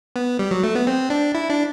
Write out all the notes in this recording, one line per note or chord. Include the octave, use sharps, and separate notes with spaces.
B3
G3
F#3
A3
B3
C4
D4
E4
D4